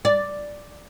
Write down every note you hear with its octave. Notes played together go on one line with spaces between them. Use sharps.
D5